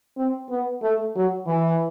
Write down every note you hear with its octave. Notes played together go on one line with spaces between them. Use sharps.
C4
B3
A3
F#3
E3